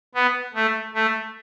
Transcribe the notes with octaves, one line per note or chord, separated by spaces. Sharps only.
B3
A3
A3